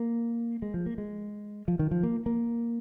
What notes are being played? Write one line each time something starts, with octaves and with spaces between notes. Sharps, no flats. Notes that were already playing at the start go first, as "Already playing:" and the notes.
Already playing: A#3
G#3
F3
A#3
G#3
F3
D#3
F3
A#3
A#3